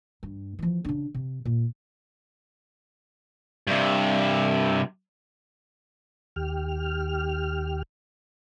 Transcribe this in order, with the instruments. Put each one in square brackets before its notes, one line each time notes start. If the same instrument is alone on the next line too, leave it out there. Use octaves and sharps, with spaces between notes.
[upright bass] G2
E3 F3
C#3 D4
C3
A#2
[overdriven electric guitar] G2 C3
[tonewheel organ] D#2 G4 F6